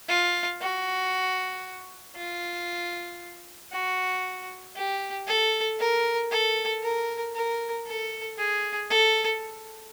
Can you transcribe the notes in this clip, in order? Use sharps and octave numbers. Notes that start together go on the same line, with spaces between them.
F4
F#4
F4
F#4
G4
A4
A#4
A4
A#4
A#4
A4
G#4
A4